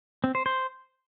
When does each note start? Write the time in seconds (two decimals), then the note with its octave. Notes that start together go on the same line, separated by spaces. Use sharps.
0.24 C4
0.35 C5
0.46 C5